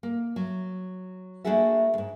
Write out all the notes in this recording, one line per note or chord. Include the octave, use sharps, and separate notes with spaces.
A#3
F#3
A3 A#3 D4 F#4 G#4 E5
D2 G#2